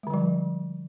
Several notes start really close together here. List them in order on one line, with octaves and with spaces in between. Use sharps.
G#3 D3 G3 F3